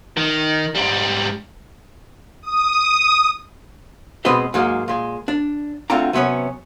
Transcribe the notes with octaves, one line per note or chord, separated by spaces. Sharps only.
D#3
G#2 G3
D#6
B2 G#3 C4 B4 C5 D#5
G#2 F#3 G#3 A#3
A#2 G#3
D4
D2 D3 C4 F4 D5 A#5
C3 F#3 B3 C#4 C#5